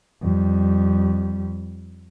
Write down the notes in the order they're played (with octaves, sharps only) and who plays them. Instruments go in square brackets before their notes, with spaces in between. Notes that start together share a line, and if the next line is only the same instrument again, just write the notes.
[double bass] F2 G3